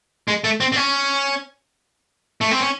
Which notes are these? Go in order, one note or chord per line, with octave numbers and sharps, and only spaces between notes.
G#3
A3
C4
C4
C#4
A3
C4
C#4